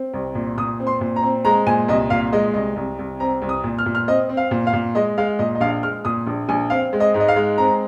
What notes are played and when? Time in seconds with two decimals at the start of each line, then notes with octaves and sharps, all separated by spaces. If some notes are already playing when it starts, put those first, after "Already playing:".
Already playing: C4
0.14 C2
0.35 A#2
0.58 A#2 D#6
0.80 C4
0.87 C6
1.01 A#2
1.16 A#5
1.23 C4
1.45 G#3 A#5
1.67 A#2 G#5
1.88 C2 D#5
2.10 A#2 F5
2.33 G#3 D#5
2.54 C2 D#5
2.76 C2
2.99 C2
3.20 C4 A#5
3.42 C2
3.49 D#6
3.64 A#2
3.78 F6
3.86 A#2
3.95 F6
4.08 C4 D#5
4.29 C4
4.37 F5
4.51 A#2
4.67 F5
4.73 A#2
4.95 G#3 D#5
5.18 G#3 F5
5.39 A#2 D#5
5.55 D#5
5.60 A#1 F5
5.83 G#3 F6
6.05 A#2 D#6
6.26 A#1
6.49 A#1 G#5
6.70 C4 F5
6.93 G#3
7.00 D#5
7.14 G#2
7.20 D#5
7.28 F5
7.36 G#3
7.58 C4 A#5